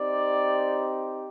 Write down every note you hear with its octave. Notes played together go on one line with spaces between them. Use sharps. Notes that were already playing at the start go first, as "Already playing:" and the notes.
Already playing: C4 D#4 G4 D5